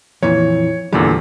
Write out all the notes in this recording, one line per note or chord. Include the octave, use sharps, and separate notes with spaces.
F2 A#2 E3 C#5
E2 A#2 D3 G3 A3